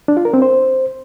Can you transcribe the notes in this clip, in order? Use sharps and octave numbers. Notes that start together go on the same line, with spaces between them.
D4
F4
A#4
C4
C5